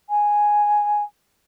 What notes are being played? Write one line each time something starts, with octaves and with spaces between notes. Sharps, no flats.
G#5